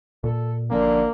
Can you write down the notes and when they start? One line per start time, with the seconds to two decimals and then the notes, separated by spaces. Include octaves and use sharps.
0.24 A#2 A4
0.70 G#1 D3 F3 A#3 C#4